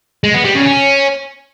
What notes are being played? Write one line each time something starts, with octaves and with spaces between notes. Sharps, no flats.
G#3
B3
G3
C#3
C#4